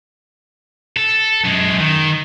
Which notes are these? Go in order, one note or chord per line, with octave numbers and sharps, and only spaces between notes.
A4
F#2 G#3
D#3